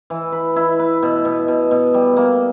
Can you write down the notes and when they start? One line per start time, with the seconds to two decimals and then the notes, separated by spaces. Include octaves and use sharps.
0.10 E3
0.32 B4
0.56 E4
0.79 B4
1.02 B2
1.25 B2
1.48 B2
1.71 B2
1.94 G3
2.16 A#3